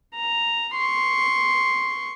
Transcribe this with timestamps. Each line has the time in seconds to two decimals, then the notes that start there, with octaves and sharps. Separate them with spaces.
0.15 A#5
0.75 C6 C#6